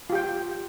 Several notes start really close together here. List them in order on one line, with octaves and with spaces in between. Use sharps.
F4 G4 G5